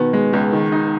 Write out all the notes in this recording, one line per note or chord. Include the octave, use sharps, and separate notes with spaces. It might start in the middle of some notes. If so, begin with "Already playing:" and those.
Already playing: B2 D#3 B3
G#3
C#2
D#3
D#4